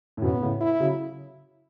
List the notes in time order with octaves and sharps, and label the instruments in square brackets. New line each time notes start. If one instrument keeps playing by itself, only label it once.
[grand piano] A2
[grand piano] F#2 B2 [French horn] B3
[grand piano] A2 C#3
[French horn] E4
[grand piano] C#3 F#3